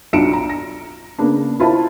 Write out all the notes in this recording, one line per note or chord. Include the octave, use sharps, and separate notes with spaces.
B1 D4 F4 C#7 D7 E7
A#5
A#6
C#3 A#3 B3 D4
E4 F4 A#4 C5 A5 B5